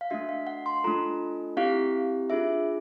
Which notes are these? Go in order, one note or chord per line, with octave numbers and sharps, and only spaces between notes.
F5
A3 D4 F#4 E5
F5
F#5
C6
A3 D4 F4 A4 A#5
C4 E4 G4 F5
D4 F4 G#4 E5